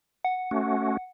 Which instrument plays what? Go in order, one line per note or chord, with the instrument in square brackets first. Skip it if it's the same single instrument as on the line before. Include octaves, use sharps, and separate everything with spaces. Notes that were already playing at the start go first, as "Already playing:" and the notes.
[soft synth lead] F#5
[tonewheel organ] A3 C#4 F#4